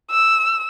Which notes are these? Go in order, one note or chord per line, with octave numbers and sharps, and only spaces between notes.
E6